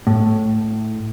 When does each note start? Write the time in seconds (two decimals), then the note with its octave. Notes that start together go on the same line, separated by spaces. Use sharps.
0.07 A2